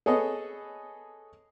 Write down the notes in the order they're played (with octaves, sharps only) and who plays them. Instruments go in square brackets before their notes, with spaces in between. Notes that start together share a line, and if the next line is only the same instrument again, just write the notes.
[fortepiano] G#4 A4 B4 C#5 D#5